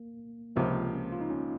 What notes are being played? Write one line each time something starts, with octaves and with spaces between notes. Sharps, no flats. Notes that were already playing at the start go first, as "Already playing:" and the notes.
Already playing: A#3
C#2 C3 F3 A#3
C#4
F4
D#4
C#4